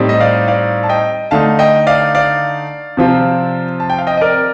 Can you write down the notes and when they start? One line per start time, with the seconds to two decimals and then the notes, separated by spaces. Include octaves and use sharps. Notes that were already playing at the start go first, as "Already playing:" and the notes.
Already playing: A2 G3 C4 D#4
0.09 D#5
0.20 D5 F5
0.48 D5 F5
0.83 A5
0.89 D#5 G5
1.31 D3 A3 D#4 F5 A5
1.59 D#5 G5
1.87 D5 F5
2.15 D5 F5
2.97 C3 F3 C4 F4
3.80 A5
3.90 G5
3.98 F5
4.07 D#5 G5
4.17 D#5
4.21 A#4 D5